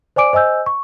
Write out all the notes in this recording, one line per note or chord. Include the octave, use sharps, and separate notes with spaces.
C5 D5 G#5 D6 D7
C5 D#5 G#5 E6 G6
C#6